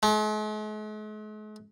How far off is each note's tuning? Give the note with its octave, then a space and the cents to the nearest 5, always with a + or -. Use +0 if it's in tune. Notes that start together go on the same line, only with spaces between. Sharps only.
G#3 +45